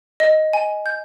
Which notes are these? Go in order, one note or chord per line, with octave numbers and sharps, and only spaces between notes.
D#5
G#5
G6